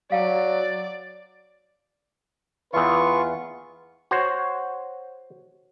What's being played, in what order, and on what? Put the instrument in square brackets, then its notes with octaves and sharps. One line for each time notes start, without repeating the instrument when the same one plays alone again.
[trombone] F#3 [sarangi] D5 [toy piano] F5 G5 A5
[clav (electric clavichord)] E2 E3 [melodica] F4 C#6 [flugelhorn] B4
[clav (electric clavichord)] F#4 C5 C#5